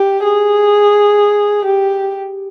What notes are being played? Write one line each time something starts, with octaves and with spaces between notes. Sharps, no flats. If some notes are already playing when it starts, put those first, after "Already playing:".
Already playing: G4
G#4
G4